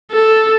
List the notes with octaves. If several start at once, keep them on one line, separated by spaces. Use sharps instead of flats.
A4